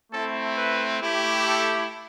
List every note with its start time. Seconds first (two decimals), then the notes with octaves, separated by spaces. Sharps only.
0.12 A3 C4 E4 A4
0.57 B4
1.01 A3 E4 G4
1.45 A4